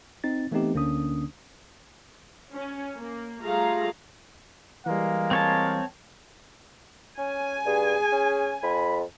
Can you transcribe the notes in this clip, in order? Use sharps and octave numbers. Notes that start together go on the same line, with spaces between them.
C4 D#4 A6
E3 A3 B3 C4 D#4 G4
D2 D3 A#3 C#4 D4 D#6
C#4
A#3
G3 A3 F4 G#4 F5 A#5
E3 G3 G#3 A#3 F5
C4 C#5 A5
C#4 G#5
G2 G#4
C#4
F2 B5